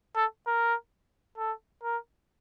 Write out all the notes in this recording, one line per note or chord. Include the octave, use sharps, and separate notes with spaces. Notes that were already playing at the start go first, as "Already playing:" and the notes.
A4
A#4
A4
A#4